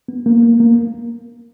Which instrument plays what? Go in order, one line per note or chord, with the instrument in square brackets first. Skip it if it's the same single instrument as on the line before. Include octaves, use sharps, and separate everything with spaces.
[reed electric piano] B3
A#3
A#3
A#3